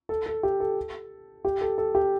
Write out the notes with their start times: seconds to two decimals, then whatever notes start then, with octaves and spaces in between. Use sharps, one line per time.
0.09 A4
0.26 A4
0.43 G4
0.60 A4
1.45 G4
1.61 A4
1.78 A4
1.95 G4